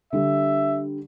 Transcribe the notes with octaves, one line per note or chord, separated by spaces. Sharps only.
D3 G3 E5